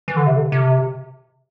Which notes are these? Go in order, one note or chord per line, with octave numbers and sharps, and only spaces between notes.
E3
D3
C3
D3
C3